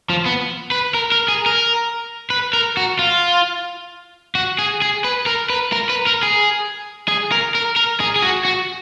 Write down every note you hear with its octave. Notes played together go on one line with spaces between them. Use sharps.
F3
B3
B4
A#4
A#4
G#4
A#4
B4
A#4
F#4
F4
F#4
G#4
G#4
B4
A#4
B4
A#4
B4
A#4
G#4
G#4
A#4
A#4
A#4
G#4
G#4
F#4
F#4